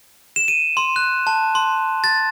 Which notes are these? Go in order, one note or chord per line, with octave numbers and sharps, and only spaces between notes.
E7
D#7
C6
F#6
A5
C6
A6